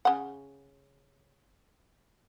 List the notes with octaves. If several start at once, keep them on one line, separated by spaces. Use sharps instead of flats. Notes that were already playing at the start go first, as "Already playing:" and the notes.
C#3 F#5